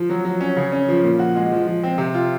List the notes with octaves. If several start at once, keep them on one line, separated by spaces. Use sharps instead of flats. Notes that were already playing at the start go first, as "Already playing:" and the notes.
Already playing: F3
F#3
F#3
C#4
C#3
C#4
F3
A#2
F#4
G#3
F3
F3
C4
C3
F4